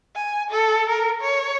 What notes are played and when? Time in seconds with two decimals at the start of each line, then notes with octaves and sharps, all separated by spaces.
0.15 G#5
0.50 A4
0.89 A#4
1.21 C#5